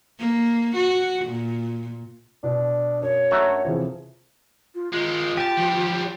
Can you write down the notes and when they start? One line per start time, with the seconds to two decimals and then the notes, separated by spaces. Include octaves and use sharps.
0.19 A#3
0.75 F#4
1.25 A#2
2.43 B2 D4
3.02 F#2 C#5
3.31 A3 D4 F#4 E5 A#5
3.64 C3 E3 F3 G#4
4.75 F4
4.93 D#3 G#3 F4
5.37 G4 G#5 A5
5.57 F3 G3